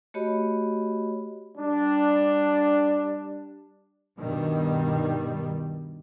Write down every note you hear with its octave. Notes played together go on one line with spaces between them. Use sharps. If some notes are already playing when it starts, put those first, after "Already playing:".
A3 F#4 G4 C#5 D#5 B5
G3 D4
G2 B2 D#3 G3